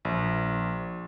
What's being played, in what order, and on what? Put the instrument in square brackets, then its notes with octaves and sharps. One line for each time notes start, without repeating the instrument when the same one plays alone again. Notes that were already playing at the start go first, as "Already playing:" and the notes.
[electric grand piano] A#1